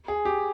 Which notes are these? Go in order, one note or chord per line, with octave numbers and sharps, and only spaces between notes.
G#4
G4